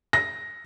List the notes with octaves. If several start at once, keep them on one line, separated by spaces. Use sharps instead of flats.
A#6